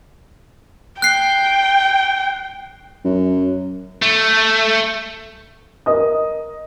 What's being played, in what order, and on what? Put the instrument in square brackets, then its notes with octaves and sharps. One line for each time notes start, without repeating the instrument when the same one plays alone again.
[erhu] G5 [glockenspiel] F#6 C7
[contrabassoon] F#2
[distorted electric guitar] A3
[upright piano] A#4 D#5 D#6